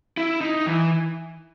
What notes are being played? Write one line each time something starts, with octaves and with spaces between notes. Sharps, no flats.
E4
D#4
E3